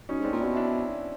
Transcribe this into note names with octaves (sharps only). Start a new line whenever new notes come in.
F#2 C#4 D#4
G#2
C4 D4
A#2
B2 D4 E4
D4 E4